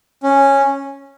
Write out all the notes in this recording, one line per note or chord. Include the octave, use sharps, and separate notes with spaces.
C#4